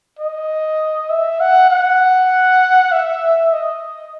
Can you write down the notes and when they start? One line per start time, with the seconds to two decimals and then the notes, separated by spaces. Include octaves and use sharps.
0.19 D#5
1.10 E5
1.41 F#5
1.70 F#5
2.92 E5
3.53 D#5